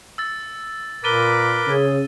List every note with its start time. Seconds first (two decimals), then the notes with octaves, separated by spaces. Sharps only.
0.18 E6 A6
1.04 A#2 A#4 B4 D6 A6 D#7 G7
1.67 C#3 G#4